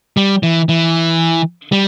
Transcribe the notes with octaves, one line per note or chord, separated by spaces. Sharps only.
G3
E3
E3
G3